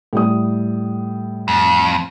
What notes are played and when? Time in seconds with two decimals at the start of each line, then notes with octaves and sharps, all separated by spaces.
0.13 A2 G3 D#6
1.48 F2